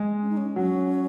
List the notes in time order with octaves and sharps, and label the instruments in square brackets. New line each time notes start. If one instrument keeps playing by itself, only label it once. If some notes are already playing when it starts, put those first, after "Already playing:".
Already playing: [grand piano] G#3
[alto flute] C#4
D#4
C#4
[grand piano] F#3 [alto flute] C#4